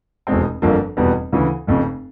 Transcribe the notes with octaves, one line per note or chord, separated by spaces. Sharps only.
F1 E2 B2 G#3 C4
G1 F2 D3 F3 A#3
F1 E2 B2 G3 B3
D2 C#3 E3
F1 F2 C#3